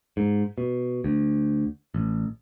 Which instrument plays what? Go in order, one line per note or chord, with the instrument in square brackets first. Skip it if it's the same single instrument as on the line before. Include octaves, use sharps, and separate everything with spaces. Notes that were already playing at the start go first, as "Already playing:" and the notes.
[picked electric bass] G#2
B2
D2
A1